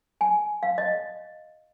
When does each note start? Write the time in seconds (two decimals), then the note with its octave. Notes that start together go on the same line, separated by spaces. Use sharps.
0.21 G#5
0.63 F5
0.78 D#5